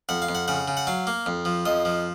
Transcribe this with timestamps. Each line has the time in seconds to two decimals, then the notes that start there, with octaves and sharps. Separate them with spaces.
0.09 F2 F#5
0.22 F5
0.29 F2
0.35 F#5
0.48 C#3 F#5
0.68 C#3
0.77 F#5
0.87 F#3 F5
1.07 A#3
1.26 F2
1.45 F3
1.66 F2 D#5
1.85 F3